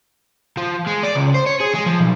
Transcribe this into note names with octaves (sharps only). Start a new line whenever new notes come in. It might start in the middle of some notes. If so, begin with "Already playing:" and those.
F3
G#3
D5
C#2
C5
C#5
G#4
G#3
F3
B1